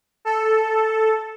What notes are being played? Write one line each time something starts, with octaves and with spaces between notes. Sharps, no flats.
A4